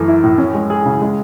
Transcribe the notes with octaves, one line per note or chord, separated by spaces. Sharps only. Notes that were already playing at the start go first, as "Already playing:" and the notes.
Already playing: F#2 E3 A3
E4
A2
C#4
G#3
G#4
C#3
G#3